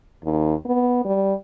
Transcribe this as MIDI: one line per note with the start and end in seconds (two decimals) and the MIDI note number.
0.24 0.54 39
0.65 1.02 59
1.05 1.33 55